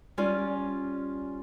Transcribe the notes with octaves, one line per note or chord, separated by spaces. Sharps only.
G3 C#4 F4 D5 G#5